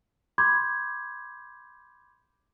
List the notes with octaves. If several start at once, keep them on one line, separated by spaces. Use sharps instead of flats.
B5 C6 D6 G6 G#6